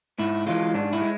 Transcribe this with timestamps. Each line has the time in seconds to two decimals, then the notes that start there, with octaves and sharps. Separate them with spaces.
0.19 G#2 E4
0.47 E3 G#3 F4
0.74 G#2 D4
0.93 E4
1.01 G#3